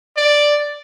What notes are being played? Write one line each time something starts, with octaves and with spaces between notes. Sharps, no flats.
D5